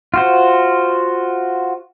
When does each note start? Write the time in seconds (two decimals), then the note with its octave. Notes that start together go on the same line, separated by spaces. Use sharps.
0.14 F4 F#4 C5